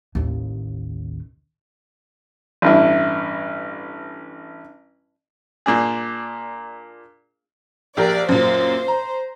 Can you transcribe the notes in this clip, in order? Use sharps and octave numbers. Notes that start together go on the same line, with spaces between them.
A1 D#2
A1 G2 E4
A#2 D4 G#4
A#1 G4 A#4 D5
F#2 A#2 C5
A#5